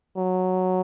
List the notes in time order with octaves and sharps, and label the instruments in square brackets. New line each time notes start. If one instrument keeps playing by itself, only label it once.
[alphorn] F#3